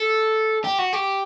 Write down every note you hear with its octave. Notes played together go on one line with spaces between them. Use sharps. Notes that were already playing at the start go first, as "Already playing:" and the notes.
Already playing: A4
G4
F#4
G4